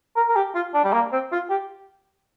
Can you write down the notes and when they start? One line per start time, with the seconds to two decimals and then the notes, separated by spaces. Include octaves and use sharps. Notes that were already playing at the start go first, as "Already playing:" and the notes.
0.16 A#4
0.29 A#4
0.36 G4
0.55 F4
0.74 D4
0.84 G3
0.93 A#3
1.12 C4
1.32 F4
1.50 G4